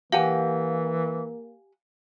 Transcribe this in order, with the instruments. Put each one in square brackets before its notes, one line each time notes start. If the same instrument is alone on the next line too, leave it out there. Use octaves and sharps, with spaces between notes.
[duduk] E3 [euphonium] A#3 [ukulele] G4 F#5 G#5 [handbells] F5